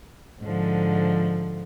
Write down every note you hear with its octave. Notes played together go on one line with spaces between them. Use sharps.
G#2 D3 F3